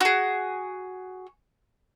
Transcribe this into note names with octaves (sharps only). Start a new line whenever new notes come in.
F#4 G#4